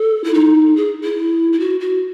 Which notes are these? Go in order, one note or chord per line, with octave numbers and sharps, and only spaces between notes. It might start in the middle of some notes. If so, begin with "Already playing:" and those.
Already playing: A4
E4
D#4
G#4
E4
E4
F#4
F#4